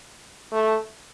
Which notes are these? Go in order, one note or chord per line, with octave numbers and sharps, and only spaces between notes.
A3